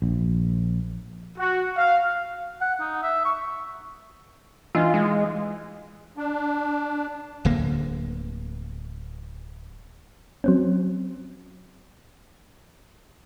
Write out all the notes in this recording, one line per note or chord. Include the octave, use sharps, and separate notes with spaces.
A#1
F#4
F5
F#5
D#4
E5
C#6
E3 D#4 F4
G#3
D4
D1 D3 A#3
F#3 C4 C#4